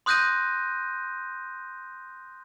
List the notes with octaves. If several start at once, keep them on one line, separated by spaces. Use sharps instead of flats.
C6 D#6 F#6 G6 A#6 D#7